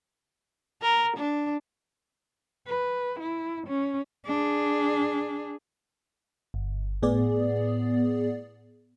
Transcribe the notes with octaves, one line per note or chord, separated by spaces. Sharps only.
A#4
D4
B4
E4
C#4
D4 G#4
G1
A2 B3 G#4 D5